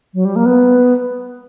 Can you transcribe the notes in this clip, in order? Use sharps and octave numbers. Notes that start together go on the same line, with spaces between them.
F#3
G3
A#3
B3